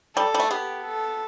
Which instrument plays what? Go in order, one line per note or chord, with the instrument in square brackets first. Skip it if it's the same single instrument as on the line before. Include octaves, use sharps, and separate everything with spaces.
[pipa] G3 [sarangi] A4
[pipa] G3
A3
[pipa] B3 [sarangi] G4
[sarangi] A4